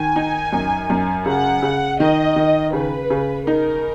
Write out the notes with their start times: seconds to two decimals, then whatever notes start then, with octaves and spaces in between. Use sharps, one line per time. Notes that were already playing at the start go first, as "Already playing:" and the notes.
Already playing: D#3 G#5
0.16 D#4
0.53 F#2
0.90 F#2
1.26 C#3 F#5
1.62 C#3
2.00 D#3 D#5
2.36 D#3
2.73 C#3 B4
3.10 C#3
3.47 D#4 A#4